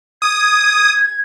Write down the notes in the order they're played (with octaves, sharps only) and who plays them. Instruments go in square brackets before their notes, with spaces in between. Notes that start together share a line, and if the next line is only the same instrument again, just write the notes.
[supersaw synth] D#6 [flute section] G#6